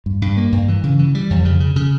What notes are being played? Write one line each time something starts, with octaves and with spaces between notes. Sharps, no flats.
G2
G2
A#3
G2
E3
C#3
E3
G3
F2
C#3
C#3
C#3